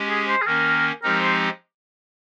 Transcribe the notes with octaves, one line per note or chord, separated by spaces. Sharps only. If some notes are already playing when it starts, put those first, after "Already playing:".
Already playing: G#3 C#4 G4
G#4
C5
G#4
D#3 A#3 C#4 A#4
F3 G#3 C4 D#4 G4 A#4
C5